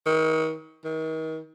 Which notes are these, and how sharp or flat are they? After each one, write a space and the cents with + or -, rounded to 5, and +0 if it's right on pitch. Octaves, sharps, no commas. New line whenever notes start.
D#3 +35
D#3 +35